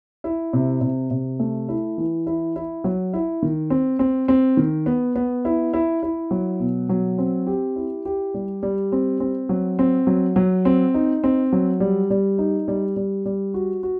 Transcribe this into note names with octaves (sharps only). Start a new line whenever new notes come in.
E4
C3
C3
C3
A3
E4
E3
E4
E4
F#3
E4
D#3
C4
C4
C4
D#3
B3
B3
E4
E4
E4
F#3
B2
F#3
C4
G4
E4
G4
G3
G3
C4
C4
F#3
C4
F#3
F#3
C4
D#4
C4
F#3
G3
G3
D#4
G3
G3
G3
F#4
F#4